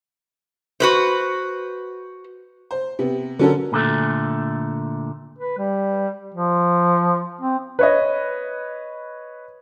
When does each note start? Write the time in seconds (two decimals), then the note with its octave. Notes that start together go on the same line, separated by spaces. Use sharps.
0.80 F#4 B4 C5
2.71 C5
2.99 C3 B3
3.39 D3 F#3 C#4 F#4 A4 A#4
3.72 A#2 D3 A3
5.39 B4
5.58 G3
6.35 F3
7.41 C4
7.79 B4 C#5 D#5